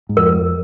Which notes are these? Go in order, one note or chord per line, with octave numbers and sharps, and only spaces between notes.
G#2
F2 A#4